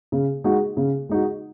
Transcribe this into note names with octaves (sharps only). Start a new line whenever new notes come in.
C#3
G#3 D#4 F#4
C#3
G#3 D#4 F#4